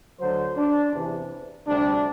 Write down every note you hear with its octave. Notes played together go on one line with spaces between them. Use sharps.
D2 D3 F#3 C5
D4
E2 C3 E3
D2 C3 G3 D4